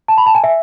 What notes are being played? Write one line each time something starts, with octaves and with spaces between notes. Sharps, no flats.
A5
B5
A5
G#5
E5